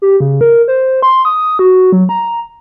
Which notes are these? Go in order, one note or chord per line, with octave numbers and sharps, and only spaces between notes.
G4
C#3
A#4
C5
C6
D#6
F#4
F#3
A#5